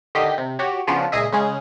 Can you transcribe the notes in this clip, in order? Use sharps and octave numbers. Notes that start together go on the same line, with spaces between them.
D3 D#3 G4 D#5 B6 C7
C3
F#4 G4 C#5
C#3 F3 B3 C#4 D4 F4
C#2 A#2 G#4 D#5 E5
C#3 G#3 C#4 G#4